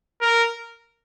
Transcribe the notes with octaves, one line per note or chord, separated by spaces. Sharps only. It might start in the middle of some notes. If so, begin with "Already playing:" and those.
A#4